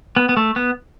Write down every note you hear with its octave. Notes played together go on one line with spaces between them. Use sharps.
B3
B3
A3
B3